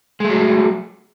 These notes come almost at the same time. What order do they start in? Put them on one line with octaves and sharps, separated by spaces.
G#3 A3 F#3